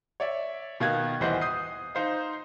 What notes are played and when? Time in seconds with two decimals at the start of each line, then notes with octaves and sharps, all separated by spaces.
0.20 C#5 D5 E5
0.80 B2 D#3 F5 F#6 G#6
1.20 D#1 E3 C5 D#5 F#5
1.41 D#6 G6 C7
1.95 D#4 C5 F5